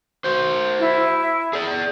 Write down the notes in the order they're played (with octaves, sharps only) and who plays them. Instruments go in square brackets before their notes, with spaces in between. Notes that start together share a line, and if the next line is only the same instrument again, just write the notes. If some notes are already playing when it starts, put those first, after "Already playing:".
[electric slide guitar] F#4 C5
[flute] E4
[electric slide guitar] G#4 D5